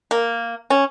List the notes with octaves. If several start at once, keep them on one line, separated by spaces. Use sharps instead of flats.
A#3
C#4